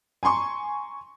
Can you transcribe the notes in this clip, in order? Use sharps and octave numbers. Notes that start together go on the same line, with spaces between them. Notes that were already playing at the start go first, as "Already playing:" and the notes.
G#5 A#5 C6 C#6